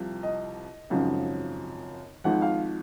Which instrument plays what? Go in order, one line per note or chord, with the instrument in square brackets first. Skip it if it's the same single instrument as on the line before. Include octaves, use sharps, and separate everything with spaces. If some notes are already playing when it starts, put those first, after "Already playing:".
Already playing: [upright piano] C2 C3 F3
D#5
G#1 F#2 C#3 F3
G#1 G#2 F3 F#5
F5